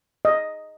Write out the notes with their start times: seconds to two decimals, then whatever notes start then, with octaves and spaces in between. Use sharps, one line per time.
0.25 D#5